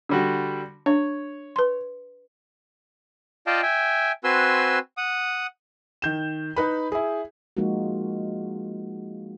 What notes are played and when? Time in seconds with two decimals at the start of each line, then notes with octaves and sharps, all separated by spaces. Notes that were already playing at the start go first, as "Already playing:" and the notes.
0.09 D3 G3 F#4
0.86 D4 C#5
1.56 B4 C6
3.47 F4 D5 D#5 F5 G5 A5
3.63 E5 G5 G#5
4.24 C4 F#4 B4 G#5 C6 E6
4.97 F#5 D#6
6.02 D#3 G6 E7
6.56 D#4 B4 B5
6.92 E4 G#4
7.57 F3 G#3 A#3 D#4 F4 F#4